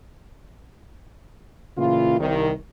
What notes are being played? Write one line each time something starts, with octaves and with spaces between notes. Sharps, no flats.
A#2 C#3 E3 F4
C2 D#3